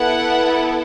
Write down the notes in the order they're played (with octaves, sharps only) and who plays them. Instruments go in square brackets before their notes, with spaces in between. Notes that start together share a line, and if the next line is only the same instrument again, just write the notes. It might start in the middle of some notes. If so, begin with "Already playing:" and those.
Already playing: [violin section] B3 E4 A4 F#5